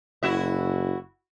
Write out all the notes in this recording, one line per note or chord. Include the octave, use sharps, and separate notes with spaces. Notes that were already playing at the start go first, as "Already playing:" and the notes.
F#1 E4 F#4 E5